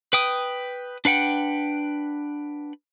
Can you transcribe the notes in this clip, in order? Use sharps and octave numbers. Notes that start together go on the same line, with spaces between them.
B4 G5 D#6
D4 B4 F#5 G5